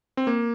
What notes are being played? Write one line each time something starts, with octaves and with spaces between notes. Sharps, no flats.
C4
A#3